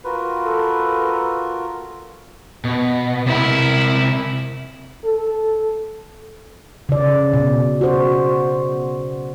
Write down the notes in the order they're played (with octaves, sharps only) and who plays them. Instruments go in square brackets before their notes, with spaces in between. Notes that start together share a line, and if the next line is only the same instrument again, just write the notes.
[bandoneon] F4 F#4 A#4 [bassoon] B4
[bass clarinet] A4
[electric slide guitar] B2
[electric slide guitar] C3 A#4 [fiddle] E4
[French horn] A4
[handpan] C#3 D5
B2
F#4 C5